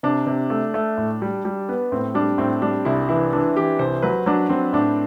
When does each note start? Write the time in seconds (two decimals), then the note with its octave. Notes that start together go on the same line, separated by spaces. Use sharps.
0.03 C3 D4
0.27 C3
0.50 A3
0.74 A3
0.98 A2
1.22 G3
1.45 G3
1.69 B3
1.92 A2 C4
2.15 G3 D4
2.38 A2 C4
2.62 G3 D4
2.85 C2 E4
3.09 E3 E4
3.33 E3 D4
3.56 E3 G4
3.79 C2 C5
4.02 F#3 B4
4.26 F#3 D4
4.49 F#3 C4
4.73 A2 D4